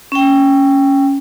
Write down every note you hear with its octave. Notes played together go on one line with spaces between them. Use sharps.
C#4 G5